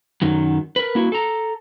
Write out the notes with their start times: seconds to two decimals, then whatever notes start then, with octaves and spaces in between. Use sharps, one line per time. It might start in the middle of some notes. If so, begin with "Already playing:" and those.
0.22 F#2 D#3 F#3
0.76 A#4 B4
0.95 A#3 E4 F#4
1.12 A4 A#5